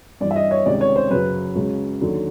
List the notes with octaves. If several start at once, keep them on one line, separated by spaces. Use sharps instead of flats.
G2 E3 D5
E5
D#5
C#5
C#2 C3 D#3 D5
C#5
C5
F#2 C#3 F#3 B4
C#2 C#3 F#3
D#2 D3 F#3